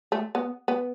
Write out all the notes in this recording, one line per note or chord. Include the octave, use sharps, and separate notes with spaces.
A3
B3
B3